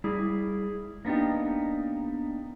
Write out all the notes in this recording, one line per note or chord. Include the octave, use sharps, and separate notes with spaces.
G3 E4 G#4
A#3 B3 D4 D#4 G4